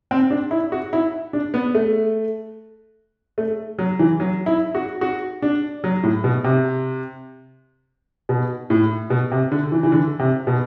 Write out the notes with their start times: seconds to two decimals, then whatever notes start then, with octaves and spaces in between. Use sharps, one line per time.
0.11 C4
0.30 D4
0.51 E4
0.72 F#4
0.93 E4
1.33 D4
1.54 B3
1.75 A3
3.38 A3
3.79 F#3
3.99 E3
4.20 F#3
4.46 E4
4.75 F#4
5.01 F#4
5.42 D4
5.84 F#3
6.03 A2
6.24 B2
6.44 C3
8.29 B2
8.70 A2
9.10 B2
9.31 C3
9.52 D3
9.72 E3
9.83 E3
9.92 D3
10.19 C3
10.47 B2